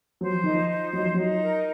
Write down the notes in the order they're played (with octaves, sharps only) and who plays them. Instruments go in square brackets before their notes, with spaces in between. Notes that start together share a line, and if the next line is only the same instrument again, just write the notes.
[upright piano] F#3 [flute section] C5
[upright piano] F3
[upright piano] D#3 [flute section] D#4
[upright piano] F3
[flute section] C5
[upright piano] F#3 [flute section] D#4
[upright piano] F3
[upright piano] F#3 [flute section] D#4
[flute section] A#4